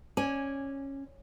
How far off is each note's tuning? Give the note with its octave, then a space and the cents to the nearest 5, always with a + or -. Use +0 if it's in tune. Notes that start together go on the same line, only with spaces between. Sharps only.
C#4 -15 D5 +0 G#5 +0